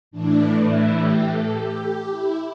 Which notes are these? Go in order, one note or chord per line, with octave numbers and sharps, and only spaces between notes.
A2 E3 D4
E4
G4
A4
G4
G4
E4